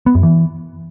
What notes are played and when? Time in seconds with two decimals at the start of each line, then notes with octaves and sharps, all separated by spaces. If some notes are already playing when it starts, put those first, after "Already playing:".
0.06 B3
0.15 F#2
0.23 E3